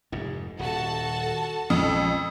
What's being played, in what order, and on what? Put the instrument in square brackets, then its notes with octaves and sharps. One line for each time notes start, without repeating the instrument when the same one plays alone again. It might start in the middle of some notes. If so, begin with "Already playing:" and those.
[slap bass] F1 G#2
[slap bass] D#1 [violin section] F#4 A4 A5
[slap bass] A#1 G#3 C#4 [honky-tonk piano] F2